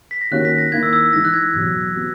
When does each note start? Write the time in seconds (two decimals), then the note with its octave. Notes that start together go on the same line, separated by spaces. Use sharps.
0.11 B6
0.21 A#6
0.31 D#3 A#3 C#4 F#4 F#6
0.45 B6
0.58 A#6
0.72 D#3 A#3 E4 G#6
0.83 E6
0.93 E6
1.13 E3 G#3 D#4 A#6
1.25 F#6
1.34 G#6
1.53 E2 B2 F#3
1.95 F#3 B3 F#4